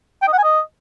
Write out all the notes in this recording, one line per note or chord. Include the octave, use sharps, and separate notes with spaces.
G5
D#5
F#5
G#5
D#5